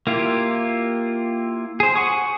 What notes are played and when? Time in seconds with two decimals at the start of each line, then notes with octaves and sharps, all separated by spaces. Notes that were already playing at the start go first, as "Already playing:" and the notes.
0.07 A#3 E4 F4 G4
1.80 G#4 C5
1.96 F#5 G#5 C#6 D#6